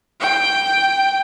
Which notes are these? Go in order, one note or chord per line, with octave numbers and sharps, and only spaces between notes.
G5